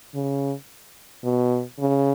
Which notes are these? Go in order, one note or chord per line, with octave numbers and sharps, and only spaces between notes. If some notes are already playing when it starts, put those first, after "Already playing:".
C#3
B2
C#3